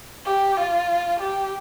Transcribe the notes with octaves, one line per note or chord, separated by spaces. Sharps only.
G4
F4
G4